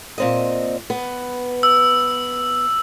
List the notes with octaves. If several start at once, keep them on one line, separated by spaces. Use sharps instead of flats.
A#2 C4 D#5
B3
E6